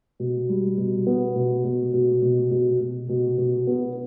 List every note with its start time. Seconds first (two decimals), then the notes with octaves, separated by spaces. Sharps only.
0.20 B2
0.49 G3
0.78 B2
1.07 B3
1.35 B2
1.64 B2
1.94 B2
2.22 B2
2.51 B2
2.80 B2
3.09 B2
3.38 B2
3.67 B3